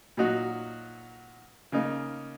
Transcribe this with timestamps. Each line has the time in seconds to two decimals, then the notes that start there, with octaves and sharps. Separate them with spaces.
0.17 A#2 F#3 D#4 F#4
1.72 C#3 A#3 D#4